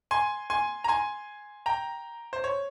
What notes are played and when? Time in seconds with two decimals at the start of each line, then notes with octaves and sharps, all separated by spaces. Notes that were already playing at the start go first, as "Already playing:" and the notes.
0.11 G#5 C6
0.50 G#5 C6
0.84 A#5
0.88 G#5 C6
1.66 G5 A#5
2.33 C5
2.44 C#5